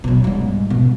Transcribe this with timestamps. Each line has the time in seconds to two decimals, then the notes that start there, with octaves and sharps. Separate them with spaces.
0.04 B2 F#3
0.24 G#2 G3
0.70 B2